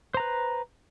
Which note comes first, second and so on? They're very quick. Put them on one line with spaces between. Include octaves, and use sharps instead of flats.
C5 A#5 B4